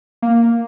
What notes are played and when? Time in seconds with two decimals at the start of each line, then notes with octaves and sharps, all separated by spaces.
0.22 A#3